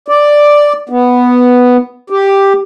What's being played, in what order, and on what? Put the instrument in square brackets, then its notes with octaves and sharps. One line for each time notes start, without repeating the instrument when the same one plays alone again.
[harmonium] D5
B3
G4